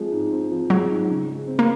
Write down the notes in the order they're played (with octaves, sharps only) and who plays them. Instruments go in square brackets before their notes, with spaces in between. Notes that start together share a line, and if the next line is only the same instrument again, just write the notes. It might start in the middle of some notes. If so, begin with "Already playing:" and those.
Already playing: [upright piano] F3 G#3 C4
G#2
C4
F3
[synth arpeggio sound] F#3 [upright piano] G#3
[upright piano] G#2
C#3
G#3
C4
[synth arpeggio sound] A#3